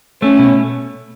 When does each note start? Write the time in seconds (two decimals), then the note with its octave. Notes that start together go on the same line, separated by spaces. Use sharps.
0.22 A3 C#4
0.39 B2